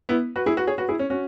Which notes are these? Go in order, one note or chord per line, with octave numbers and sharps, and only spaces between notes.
B3 E4
F#4 B4
E4 G#4
F#4 B4
G#4 C#5
F#4 B4
E4 G#4
C#4
C#4 F#4